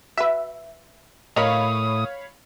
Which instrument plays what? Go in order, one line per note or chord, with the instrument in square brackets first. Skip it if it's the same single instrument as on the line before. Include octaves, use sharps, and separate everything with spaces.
[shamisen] F#4 B4 [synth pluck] E5
[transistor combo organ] A2 D#6 [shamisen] A#4 D#5 [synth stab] C#5 F5 B5